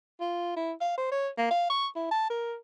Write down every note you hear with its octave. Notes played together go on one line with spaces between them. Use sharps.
F4
E4
F5
C5
C#5
A#3
F5
C#6
E4
A5
A#4